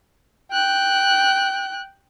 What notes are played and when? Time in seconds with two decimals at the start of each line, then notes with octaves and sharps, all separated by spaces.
0.51 G5 F#6